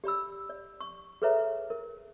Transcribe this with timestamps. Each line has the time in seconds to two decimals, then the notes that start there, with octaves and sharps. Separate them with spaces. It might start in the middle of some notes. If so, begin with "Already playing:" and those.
0.04 G4 D5 B5 E6
0.50 D5
0.81 C#6
1.22 G#4 A4 B4 C#5 E5 A#5
1.70 A#4